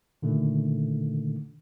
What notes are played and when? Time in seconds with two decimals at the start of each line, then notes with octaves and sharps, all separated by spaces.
0.22 A#2 D3 D#3 A3